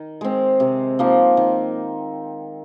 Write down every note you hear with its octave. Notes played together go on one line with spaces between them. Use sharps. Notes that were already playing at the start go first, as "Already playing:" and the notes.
Already playing: D#3
G#3 C4
C3
F3 A#3 D#4
D#3